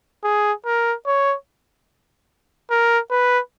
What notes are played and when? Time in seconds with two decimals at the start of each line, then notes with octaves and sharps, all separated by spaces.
0.24 G#4
0.66 A#4
1.07 C#5
2.70 A#4
3.11 B4